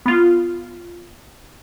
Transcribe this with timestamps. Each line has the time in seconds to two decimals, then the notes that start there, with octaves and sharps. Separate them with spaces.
0.06 B3 F4